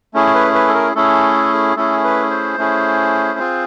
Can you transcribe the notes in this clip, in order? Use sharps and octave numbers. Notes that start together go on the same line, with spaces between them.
A3 C#4 E4 G#4
B4
B4
A4
A#4
A3 C#4 E4 G#4 A4
A3 C#4 E4 G#4 A4
B4
C5
A3 C#4 E4 G#4
C4 F4 G#4